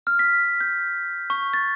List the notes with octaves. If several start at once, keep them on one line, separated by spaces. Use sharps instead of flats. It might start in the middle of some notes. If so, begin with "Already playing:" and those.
F6
B6
G6
C#6
A6